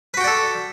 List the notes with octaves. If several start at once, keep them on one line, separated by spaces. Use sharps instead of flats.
F#4 A4 B4 D5 G5